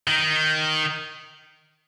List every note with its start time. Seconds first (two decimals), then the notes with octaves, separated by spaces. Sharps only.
0.08 D#3